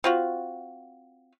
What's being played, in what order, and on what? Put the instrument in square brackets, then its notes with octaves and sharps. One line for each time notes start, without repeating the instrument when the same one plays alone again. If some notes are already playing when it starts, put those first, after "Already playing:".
[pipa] C4 F4 F#4